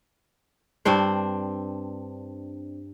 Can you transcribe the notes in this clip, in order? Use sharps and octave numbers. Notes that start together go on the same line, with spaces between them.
G2 C4 D4 C5